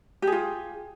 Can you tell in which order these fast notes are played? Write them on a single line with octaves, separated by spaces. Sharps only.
G4 G#4 F4